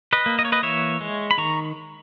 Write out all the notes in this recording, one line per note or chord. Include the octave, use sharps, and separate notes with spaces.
B4 D#5
A#3
D#5
C#5
B4 D#5
E3 C#5 E5
G#3
B5
D#3 A#5 C#6